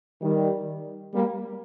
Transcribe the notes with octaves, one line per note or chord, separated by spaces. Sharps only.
D#3 G3
G3 A#3